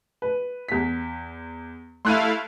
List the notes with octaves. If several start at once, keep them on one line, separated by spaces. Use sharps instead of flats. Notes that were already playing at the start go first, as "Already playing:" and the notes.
B4
E2 B6
A3 E4 F5 C6 F#6 D#7